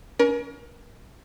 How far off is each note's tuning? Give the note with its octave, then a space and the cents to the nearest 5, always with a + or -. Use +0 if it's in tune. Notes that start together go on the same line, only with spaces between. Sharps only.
C#4 +35 A#4 +35